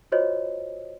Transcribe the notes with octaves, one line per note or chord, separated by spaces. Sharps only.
F4 F#4 C5 C#5 D#5